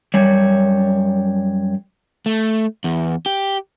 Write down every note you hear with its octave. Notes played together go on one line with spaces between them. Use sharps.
F#2 G3 C#5
A3
E2
G4